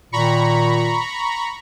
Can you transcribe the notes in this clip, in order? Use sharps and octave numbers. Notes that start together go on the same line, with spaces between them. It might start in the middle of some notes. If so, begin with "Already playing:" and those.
A#2 D#3 A#5 B5 C#6